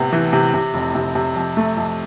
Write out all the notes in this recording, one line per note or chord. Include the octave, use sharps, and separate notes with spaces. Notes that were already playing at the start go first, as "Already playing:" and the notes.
Already playing: A2 C3 B3
E3
C3
C3
F1
C3
C3
F2
A3
F2